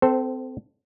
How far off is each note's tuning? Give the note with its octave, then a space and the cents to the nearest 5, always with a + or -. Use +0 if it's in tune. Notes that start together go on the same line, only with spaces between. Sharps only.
C4 -25 A4 +0 C5 +0